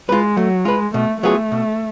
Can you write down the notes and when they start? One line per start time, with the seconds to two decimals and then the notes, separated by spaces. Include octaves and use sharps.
0.09 G#3 F4 B4
0.37 F#3 A3
0.65 G#3 F4 B4
0.94 B2 A3
1.22 F#3 A3 B3 F4 G#4
1.52 B2